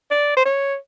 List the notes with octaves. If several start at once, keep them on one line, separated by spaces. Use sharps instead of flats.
D5
C5
C#5